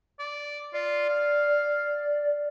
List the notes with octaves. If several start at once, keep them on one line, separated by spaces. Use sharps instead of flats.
D5
F4 D5
F5